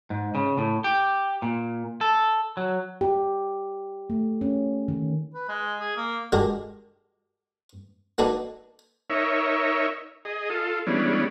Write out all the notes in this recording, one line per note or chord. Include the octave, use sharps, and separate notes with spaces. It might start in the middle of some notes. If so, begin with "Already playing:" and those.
G#2
C#3
A2
G4
A#2
A4
F#3
G4
A3
C#4
D#3
B4
G#3
G#4
A#3
D3 G#3 F#4 G4 A4 A#4
A#3 D4 D#4 F#4 A4 B4
D#4 A#4 C#5 E5
G#4 D#5
F4 A4
E3 G3 G#3 B3 C#4 D4